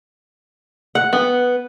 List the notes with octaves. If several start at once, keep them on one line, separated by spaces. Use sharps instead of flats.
F#5
B3